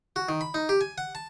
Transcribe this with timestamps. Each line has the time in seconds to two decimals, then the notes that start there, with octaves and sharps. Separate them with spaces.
0.16 F#4
0.29 D#3
0.41 B5
0.54 D#4
0.69 G4
0.81 G#5
0.98 F#5
1.15 A5